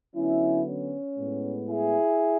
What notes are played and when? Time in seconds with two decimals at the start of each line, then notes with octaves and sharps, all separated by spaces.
0.16 D3 F#3 B3 C#4 E4
0.66 C#4
1.17 A2 G#3 B3
1.68 E4 G#4